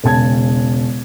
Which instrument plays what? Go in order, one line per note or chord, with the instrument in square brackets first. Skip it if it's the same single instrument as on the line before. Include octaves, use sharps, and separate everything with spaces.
[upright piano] E1 C#3 A5 G#6